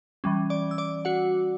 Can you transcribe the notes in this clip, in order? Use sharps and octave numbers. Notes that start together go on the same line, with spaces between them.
E3 G3 C#4
D5 D6
E6
D5 D6
F#4 F#5